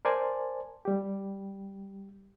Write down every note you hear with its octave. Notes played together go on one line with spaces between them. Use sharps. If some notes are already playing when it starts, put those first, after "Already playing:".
A#4 C5 D5 G#5 A5
G3 G4